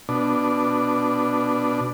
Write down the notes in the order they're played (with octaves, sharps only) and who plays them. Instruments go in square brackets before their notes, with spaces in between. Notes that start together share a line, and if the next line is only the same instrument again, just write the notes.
[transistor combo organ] B2 D4